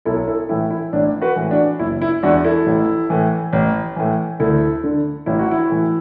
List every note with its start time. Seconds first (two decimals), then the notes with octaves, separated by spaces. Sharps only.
0.05 B1 E4 A4
0.28 E4 A4
0.49 A2 E3 E4
0.70 E4
0.93 A1 D4
1.22 F#4 B4
1.36 A2 E3
1.51 D4 F#4
1.79 F#1 E4
2.02 E4
2.23 E2 E3 D4 F#4
2.44 E4 A4
2.66 A1
3.10 A2 E3
3.53 A1
3.96 A2 E3
4.40 D2 E4 A4
4.84 D3
5.26 A1 E4
5.39 F#4
5.51 E4
5.70 A2 E3